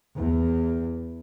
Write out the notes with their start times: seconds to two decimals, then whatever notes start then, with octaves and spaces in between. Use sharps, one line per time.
0.15 E2